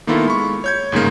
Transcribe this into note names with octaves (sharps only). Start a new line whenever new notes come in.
D#3 A#3 B3 E4 F4 A4
G#3 B5 C#6
C#5 G6 G#6
G1 G#2 C#3 A#3